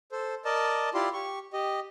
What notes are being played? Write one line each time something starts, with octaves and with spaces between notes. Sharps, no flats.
A4 C5
A#4 D5 D#5 A5
E4 F4 G4 D5 C6
G4 C#6
G4 D#5